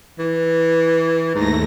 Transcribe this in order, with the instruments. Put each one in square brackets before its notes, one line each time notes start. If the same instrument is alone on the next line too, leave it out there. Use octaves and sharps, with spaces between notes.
[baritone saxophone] E3
[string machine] D#2 A3 A#6 [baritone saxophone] G#2